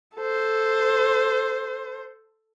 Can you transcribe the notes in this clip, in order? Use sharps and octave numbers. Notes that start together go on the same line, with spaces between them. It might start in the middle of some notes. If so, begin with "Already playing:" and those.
A4 C5